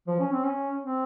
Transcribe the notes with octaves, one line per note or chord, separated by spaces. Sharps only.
F3
C#4
C4
C#4
C4